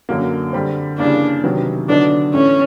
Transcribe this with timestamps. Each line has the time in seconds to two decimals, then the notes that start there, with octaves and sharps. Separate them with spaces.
0.09 F#2 D3 F#3 A#3
0.53 D3 G3 C4
0.98 C#3 E3 G3 A#3 D4
1.44 C3 D#3 F#3 B3
1.88 D3 F#3 B3 D4 D#4
2.33 A2 E3 A3 C#4